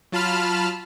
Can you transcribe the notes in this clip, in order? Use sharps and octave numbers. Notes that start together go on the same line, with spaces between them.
F#3 F4 A5 B5 F6